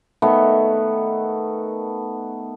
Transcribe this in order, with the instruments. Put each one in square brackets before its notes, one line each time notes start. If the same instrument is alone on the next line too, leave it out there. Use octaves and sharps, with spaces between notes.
[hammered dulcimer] D#3 A3 B3